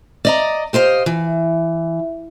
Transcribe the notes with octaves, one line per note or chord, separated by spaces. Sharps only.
D5 D#5 A#5
G4 C5 D#5 F5
E3